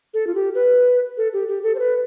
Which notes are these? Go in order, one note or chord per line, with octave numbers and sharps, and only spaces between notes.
A4
F4
G4
B4
A4
G4
G4
A4
C5
B4